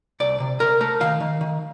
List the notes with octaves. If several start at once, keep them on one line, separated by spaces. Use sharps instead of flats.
C2 D5
C3
C3 A#4
A3 A#4
D#3 F5
D#3
D#3